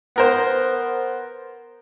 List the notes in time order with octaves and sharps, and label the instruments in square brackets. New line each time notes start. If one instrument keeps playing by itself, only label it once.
[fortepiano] B3 A#4 C5